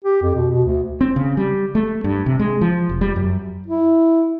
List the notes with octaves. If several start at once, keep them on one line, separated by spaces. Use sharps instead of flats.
G4
F2
B2
B2
D2
C4
C#3
G3
A3
G2
C3
G#3
F3
F1
G3
F#2
E4